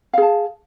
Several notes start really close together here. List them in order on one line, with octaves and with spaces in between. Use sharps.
F5 G#4 A5